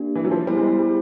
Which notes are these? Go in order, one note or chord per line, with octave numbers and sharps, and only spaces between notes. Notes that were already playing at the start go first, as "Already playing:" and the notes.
Already playing: A#3 D4 G4
E3
F#3
F3
G3 B3 E4 G#4 C5
G#3
G3
G3